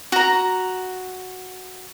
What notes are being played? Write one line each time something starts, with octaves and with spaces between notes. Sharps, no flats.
F#4 A#5